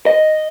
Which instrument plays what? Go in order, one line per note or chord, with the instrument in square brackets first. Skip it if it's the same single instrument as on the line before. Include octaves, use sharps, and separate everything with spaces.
[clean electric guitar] D#5